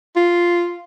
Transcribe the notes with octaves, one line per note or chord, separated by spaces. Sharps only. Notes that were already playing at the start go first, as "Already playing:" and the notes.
F4